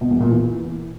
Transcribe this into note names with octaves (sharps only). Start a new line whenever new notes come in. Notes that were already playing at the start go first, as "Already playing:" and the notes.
B2
E2
A#2
E3